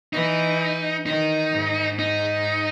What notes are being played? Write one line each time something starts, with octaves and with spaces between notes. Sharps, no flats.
E3 D#4
D#3 D#4
G#2
D#4